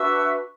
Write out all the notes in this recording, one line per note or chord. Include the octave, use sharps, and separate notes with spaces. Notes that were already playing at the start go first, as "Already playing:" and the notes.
Already playing: D4 F#4 B4 E5 E6